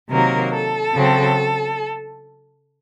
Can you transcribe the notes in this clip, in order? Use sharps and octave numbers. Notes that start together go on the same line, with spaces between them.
C3 D#3 F#3 A#3 A#4
A4
C#3 F#3 C4